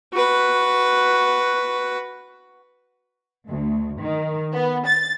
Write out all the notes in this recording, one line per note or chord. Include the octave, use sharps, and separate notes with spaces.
F#4 B4
D2
D#3
B3
A6